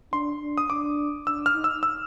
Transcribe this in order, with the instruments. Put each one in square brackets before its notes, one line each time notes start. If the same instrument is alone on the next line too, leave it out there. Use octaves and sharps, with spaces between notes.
[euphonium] D4 [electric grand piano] C6
[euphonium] D4
[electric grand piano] D#6
[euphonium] D4 [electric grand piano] D6
[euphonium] D4 [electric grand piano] E6
[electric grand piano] F6
[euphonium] D#4
[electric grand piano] E6
E6